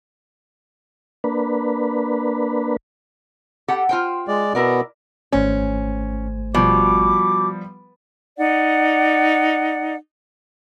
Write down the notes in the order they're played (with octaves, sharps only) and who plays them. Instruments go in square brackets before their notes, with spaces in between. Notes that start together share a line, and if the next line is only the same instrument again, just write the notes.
[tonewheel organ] A#3 D4 B4
[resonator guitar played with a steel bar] G4 A4 F#5
F4 C5 G5
[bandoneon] G#3 D5
[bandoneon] B2 B3 [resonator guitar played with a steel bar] E4 A#4 D5
[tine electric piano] G#1 A3 C5 [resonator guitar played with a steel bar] C#4 [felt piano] G#5
[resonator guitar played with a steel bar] B2 [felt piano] F3 G3 [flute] D6
[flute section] D#4 D5 F#5